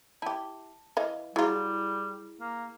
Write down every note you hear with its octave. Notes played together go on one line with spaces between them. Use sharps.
E4 G4 A5
E3 D#5 F5
F#3 G3 E4 F4 G#4 A#5
A#3